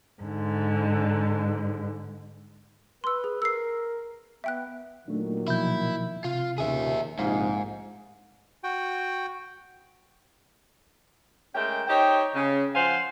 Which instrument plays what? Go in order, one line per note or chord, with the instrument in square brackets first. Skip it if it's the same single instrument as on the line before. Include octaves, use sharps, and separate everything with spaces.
[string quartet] G#2 D3
[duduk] B4 [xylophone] C6 E6
[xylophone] G#4
[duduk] A#4 [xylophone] E6 C7
[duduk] B3 [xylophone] E5 G5 F#6
[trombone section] A#2 D#3 F#3 [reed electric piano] A3 D4
[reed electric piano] B2 F3 G6 [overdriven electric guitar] E4
[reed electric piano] C3 [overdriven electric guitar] F4
[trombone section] D#2 A#2 C#3 [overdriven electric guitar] G#4 E5
[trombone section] A#1 C3 D#4 [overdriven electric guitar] G#2 [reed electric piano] C5 F5
[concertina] F#4 G5
[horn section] G#3 A3 C#4 A#4 G5
D#4 G4 C5 C#5 G5
C#3
F3 C5 F5 F#5 G#5 C6